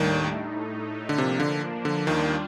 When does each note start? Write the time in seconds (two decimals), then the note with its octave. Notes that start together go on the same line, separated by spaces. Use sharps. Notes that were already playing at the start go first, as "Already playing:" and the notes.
Already playing: D#2 A2 D#3 G3 D4
0.30 A2 A3 D#4
1.09 D3
1.18 C3 F3 A#3 D4
1.40 D3
1.85 D3
2.07 D#2 D#3 G3 D4 F4